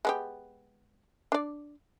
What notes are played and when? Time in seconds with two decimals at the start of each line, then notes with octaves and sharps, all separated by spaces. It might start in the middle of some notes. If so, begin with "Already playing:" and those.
0.05 G#3 B3 G4
1.32 D4 D5